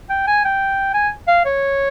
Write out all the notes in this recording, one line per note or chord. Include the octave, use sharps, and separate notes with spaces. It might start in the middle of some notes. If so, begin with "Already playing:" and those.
G5
G#5
G5
G#5
F5
C#5